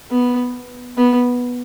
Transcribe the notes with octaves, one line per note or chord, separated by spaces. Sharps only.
B3
B3